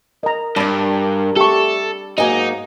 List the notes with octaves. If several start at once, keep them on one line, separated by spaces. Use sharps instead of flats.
A#4 D#5 A#5
G2 G3 D4 A5 B5
A3 G4 A4 C#6
G#2 F#3 A#3 D#4 D#5 G#5